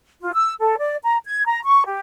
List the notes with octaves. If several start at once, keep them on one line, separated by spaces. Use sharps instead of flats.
F4
E6
A4
D5
A#5
G#6
A#5
C#6
G4